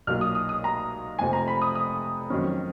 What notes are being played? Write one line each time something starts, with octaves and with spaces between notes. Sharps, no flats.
B1 A#2 F#3 A#3 F6
D#6
D#6
D#6
A#5
F1 F2 F3 G#5
A#5
B5
D#6
D#6
F2 D#3 F#3 C#4